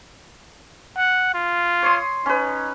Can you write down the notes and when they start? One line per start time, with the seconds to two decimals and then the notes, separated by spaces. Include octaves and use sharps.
0.97 F#5
1.34 F4
1.83 C#5 C6 D#6
2.26 C#4 D#4 B4